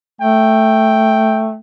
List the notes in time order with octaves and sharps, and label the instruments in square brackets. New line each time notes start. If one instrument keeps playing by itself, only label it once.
[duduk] A3 [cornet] G5